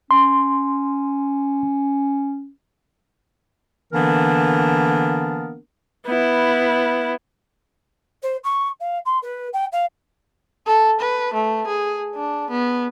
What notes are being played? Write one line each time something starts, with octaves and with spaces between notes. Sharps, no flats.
C#4 C6
D3 E3 A#3 B3 D4 A#4
B3 E4
C5
C#6
F5
C6
B4
G5
F5
A4
B4
A3
G#4
D4
B3